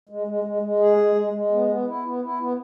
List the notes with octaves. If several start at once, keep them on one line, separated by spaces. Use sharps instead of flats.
G#3
G#3
G#3
G#3
G#4
G#3
G#3
G#3
B3
B3
E4
B3
E4
B3